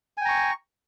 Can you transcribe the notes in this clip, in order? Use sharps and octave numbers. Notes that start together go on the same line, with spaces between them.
G5 G#5 A#5 C#6